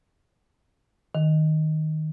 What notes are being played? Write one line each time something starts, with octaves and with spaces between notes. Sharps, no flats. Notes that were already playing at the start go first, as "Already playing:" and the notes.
D#3